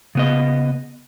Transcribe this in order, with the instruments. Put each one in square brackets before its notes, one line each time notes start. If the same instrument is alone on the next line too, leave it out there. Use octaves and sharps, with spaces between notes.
[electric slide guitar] C#3 B3 D#5